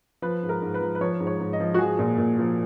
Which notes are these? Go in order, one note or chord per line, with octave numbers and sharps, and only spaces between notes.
F3 B4
G#2
A#4
G#2
B4
F3
B4
F3 C#5
G#2
C#5
G#2
D#5
F3
F#4
F3 G#4
A#2
A#2
F3